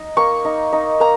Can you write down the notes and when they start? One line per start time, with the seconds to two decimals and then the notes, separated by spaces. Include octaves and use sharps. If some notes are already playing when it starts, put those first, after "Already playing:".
Already playing: D#4
0.17 A#3 C#6
0.45 D#4
0.73 D#4
1.00 A#3 A#5